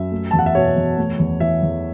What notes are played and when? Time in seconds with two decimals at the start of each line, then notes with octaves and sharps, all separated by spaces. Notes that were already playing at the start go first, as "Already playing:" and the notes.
Already playing: F#2 E5
0.12 A3
0.31 E2 A5
0.39 F#5
0.46 E5
0.55 B2 C#5
0.77 E2
0.97 A3
1.19 E2
1.40 E3 E5
1.63 E2